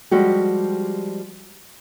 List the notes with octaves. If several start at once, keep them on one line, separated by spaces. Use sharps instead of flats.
F3 G3 G#3 F#4 G4